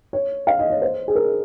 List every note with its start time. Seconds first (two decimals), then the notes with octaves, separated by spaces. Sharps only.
0.13 C#5
0.47 F5
0.59 D#5
0.70 C#5
0.82 C5
1.08 G#4
1.15 A#4